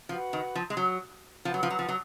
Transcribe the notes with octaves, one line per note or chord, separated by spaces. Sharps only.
F3 F#4 B4 F#5 B5
D#3
F3
G#3
F#3
F3 B4 F#5 B5
F#3
F3
F#3
F3
F#3